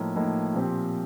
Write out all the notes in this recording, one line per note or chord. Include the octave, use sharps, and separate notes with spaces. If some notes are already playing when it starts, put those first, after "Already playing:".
Already playing: A2 F3 A#3 D#4
A2 F3 A#3 D#4
A#2 F3 C4 G4